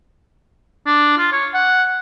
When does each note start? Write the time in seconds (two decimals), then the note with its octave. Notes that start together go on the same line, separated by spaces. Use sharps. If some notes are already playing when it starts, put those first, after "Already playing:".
0.87 D4
1.18 F4
1.32 C#5
1.54 F#5